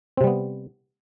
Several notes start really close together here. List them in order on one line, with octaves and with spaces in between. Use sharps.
C4 C3 G3 B3